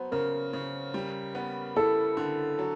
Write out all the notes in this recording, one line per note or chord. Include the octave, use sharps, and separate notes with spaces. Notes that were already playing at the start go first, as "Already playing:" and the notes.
Already playing: F#3 B3 C5
C#3 A#4
C#3
G3
B3
E4 A4
D3
F#3